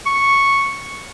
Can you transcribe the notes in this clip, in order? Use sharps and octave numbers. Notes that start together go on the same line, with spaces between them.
C#6